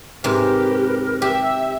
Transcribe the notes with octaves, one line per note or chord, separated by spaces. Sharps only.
G#2 C3 G4 A#4 B4 F6
G4 E5